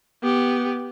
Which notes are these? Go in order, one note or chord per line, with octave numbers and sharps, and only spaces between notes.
B3 G4